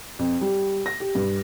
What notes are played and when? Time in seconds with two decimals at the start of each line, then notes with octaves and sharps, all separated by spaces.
0.19 F2
0.41 G3
0.86 A#6
1.00 G4
1.15 G2